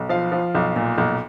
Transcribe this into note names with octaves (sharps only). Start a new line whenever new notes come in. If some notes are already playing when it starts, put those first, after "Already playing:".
Already playing: B1
F3 F5
F3
B1
A#2
B1